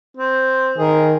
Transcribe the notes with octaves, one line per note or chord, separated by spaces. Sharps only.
C4
D#3 G#4 A#4